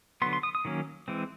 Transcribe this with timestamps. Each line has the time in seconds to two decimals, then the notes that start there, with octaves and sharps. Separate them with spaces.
0.22 D3 F#3 B3 C6
0.33 C6
0.43 D#6
0.55 D#6
0.65 D#3 F#3 A#3 C#4
1.08 E3 G#3 C4